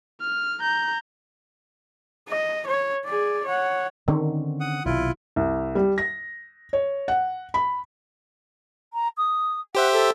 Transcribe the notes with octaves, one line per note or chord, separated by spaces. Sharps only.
F6
A#5 G6
D#5
C#5
G#4 D5
C#5 F#5
D3 D#3 C4 C#4
F#5 D#6
B1 C3 E4 F4
C2
G3
A#6
C#5
F#5
B5
A#5
D#6
G4 C5 E5 F#5
A4